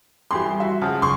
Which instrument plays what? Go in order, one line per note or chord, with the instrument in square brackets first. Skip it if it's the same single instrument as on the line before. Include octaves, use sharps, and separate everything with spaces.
[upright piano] F2 E3 G4 [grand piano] B5 [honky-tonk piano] C6
[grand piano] G3
[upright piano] F#4 E5
[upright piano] C#3 F3 G#3 [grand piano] F#5 A5 F6
[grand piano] F#1 [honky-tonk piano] C6 C#6